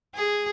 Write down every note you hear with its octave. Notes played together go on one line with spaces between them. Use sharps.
G#4